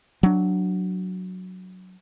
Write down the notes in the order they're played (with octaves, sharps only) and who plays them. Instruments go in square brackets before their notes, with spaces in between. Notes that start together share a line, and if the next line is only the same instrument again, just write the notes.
[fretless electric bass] F#3 D4